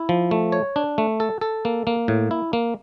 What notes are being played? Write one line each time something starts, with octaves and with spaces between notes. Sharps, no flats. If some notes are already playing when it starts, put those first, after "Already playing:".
Already playing: E4
F3
A3
C#5
D4
A3
A4
A4
A#3
A#3
A2
E4
A#3